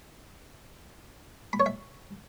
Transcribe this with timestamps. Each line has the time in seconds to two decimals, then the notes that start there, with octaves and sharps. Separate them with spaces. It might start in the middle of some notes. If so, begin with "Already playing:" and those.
1.53 B5
1.60 C#5
1.66 E5